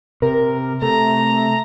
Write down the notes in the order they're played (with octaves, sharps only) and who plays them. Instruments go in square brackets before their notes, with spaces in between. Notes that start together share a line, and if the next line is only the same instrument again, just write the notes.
[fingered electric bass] C3 [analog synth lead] A#4
[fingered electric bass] C3 [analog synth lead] A3 [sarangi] A#5